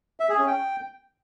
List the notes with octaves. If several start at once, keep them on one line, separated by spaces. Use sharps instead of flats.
E5
G#4
C#4
G5